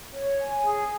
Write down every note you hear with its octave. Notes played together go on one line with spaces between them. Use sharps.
C#5
G#5
G#4